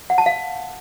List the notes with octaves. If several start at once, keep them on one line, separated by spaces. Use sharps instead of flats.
F#5
A5
F5